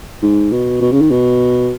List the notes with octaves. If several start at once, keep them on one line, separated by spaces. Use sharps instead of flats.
G#2
B2
B2
C#3
D#3
B2